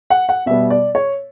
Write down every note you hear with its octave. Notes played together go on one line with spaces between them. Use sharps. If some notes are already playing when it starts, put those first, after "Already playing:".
F#5
F#5
B2 G3 B3 E5
D5
C#5